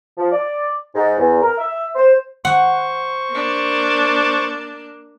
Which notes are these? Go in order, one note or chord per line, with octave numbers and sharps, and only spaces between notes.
F3
D5
G#2
E2
A#4
E5
C5
C5 F#5 C#6
A#3 D4